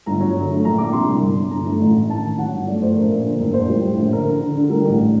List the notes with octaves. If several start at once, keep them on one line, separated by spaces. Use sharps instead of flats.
G1 A#5
F#3
D3
A3
A#1 A#5
A#1 D6
C3 C6
C2
G1
F#3
D3 A#5
A3
A1
A1
D#3 A5
D#2
F#3 F#5
G1
A3 D5
A3 C5
A#1 A#4
A#2
D3
F#1
A#2 C5
G3
A2
A#1
D3 A#4
D3
D3
D3
G3 A#4
A1